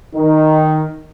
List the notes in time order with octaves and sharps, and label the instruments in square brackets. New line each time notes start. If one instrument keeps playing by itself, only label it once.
[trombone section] D#3 [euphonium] D#4